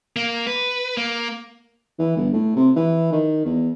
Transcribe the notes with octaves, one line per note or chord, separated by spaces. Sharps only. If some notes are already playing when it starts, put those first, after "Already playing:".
A#3
B4
A#3
E3
G1
A2
C3
E3
D#3
E2